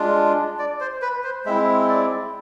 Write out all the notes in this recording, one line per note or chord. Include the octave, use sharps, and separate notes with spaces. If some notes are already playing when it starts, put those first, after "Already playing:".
Already playing: G#3 D4 F4
D5
C5
B4
C5
G#3 C4 E4 E5
D5